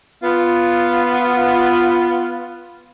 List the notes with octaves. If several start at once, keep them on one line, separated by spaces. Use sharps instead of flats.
B3 F4